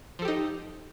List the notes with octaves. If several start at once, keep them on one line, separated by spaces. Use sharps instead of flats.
F3 D#4 G4 A4